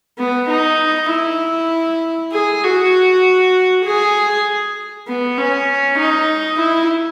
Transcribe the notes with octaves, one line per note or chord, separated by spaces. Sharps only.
B3
D#4
E4
G#4
F#4
G#4
B3
C#4
D#4
E4